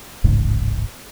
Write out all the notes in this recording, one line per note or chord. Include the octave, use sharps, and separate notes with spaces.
D1 A1 G#2 C#3